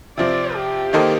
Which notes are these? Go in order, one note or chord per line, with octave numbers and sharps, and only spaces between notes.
C3 F3 C4 D5
G4
D#3 A#3 D#4 A4 C5